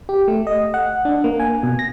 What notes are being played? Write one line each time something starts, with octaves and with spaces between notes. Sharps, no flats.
G4
A3
D#5
F#5
D4
A#3
G#5
B2
A#6